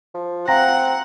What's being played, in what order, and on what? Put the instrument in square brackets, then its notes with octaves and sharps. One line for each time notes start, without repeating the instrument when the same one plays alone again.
[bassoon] F3
[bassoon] C4 [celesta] F5 A#5 A#6 [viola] F#5